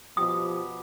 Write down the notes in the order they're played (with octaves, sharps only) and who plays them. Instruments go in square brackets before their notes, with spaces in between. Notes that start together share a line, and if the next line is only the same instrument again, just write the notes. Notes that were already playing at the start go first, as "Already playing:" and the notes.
[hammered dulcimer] B2 G4 [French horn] F3 [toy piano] D#6